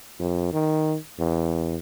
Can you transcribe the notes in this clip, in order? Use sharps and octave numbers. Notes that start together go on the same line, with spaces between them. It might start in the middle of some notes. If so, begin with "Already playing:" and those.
F2
D#3
E2